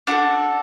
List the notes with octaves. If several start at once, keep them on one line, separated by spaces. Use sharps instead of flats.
D4 F#4 A4 F#5